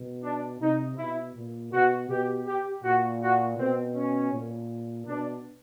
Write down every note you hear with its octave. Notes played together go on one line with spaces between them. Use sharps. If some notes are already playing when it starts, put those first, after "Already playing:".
Already playing: B2
D4
C3 D#4
B2 E4
A#2
B2 F#4
B2 G4
G4
A#2 F#4
F#4
B2 C4
C#4
A#2
B2 D4